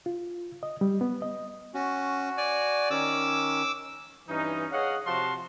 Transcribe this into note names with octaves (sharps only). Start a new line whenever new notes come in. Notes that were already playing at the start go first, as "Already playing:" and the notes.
F4
D#5
G3
B3
D#5
C#4 F#4
D5 G#5
D#3 C#4 D6 E6
G2 E3 C#4 D#4
G#4 C#5 D#5 F5 F#5
C3 F3 F#4 F5 A5 C6